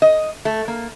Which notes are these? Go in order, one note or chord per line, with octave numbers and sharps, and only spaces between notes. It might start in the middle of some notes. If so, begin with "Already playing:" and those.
D#5
A3
A#3